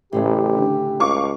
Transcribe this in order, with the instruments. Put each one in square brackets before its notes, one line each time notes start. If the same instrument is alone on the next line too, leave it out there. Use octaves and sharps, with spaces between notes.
[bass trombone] A1 [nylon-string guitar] A2 C#3 A3 [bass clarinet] G4
[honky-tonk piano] D3
[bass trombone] C#2 [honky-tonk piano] F5 C#6 D6